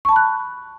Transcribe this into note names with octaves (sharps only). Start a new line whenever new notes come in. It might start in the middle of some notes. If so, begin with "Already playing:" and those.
A5 B5 C#6 F#6